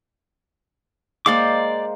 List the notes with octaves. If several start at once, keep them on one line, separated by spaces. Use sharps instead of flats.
G#3 A#3 C5 D5 F5 D6